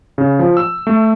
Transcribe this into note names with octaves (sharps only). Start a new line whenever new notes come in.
C#3
F3
E6
A3